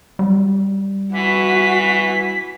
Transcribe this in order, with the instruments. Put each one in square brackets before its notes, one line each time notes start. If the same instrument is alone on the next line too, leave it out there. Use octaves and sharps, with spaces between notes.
[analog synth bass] G3
[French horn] E3 [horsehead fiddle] F#4 [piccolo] B6